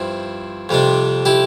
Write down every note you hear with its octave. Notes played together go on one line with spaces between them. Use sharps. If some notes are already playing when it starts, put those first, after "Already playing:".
Already playing: G2 F3 C4 E4
F2 C3 G3 D4
E4 G4